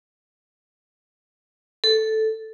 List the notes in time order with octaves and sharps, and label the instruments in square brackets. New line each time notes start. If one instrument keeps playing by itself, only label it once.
[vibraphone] A4